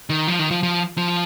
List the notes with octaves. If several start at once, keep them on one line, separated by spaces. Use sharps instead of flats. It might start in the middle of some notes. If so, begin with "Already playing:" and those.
D#3
F3
D#3
F3
F3
F3